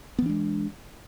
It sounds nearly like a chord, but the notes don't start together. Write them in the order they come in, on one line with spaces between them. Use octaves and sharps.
B3 E3 D4 G#3